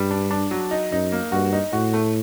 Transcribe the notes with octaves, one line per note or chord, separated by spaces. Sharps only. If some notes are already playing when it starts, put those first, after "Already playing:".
Already playing: G2 G3
D4
D4
F#3
D#4
F#2 D#4
A#3
G2 F#4
D#4
A2 F#4
A3